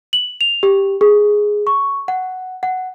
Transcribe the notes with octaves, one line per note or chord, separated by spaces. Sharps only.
F#7
F7
G4
G#4
C#6
F#5
F#5